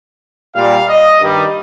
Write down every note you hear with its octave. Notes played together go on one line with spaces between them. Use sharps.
A#2 G3 F5
D#5
G2 D#3 G3